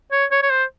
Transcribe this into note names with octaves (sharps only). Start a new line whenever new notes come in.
C#5
C#5
C#5
C5